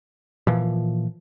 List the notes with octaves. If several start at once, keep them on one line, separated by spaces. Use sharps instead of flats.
A#2 E3 F3